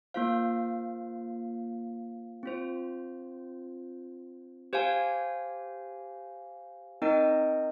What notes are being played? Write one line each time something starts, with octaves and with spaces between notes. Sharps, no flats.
A#3 F4 C5 F5
C4 F4 C5
G4 C5 F5 G#5
C4 D#4 A#4 D#5 G5